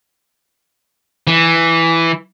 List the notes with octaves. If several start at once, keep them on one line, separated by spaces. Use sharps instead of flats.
E3